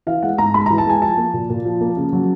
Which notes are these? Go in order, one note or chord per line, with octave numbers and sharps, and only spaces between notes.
E3 F5
G#3 F#5
G#2 A#5
G#2 B5
E3 A#5
A5
G#3 G#5
F3 A5
A#3
A#2
A#2
F3
A#3
C#3
F#3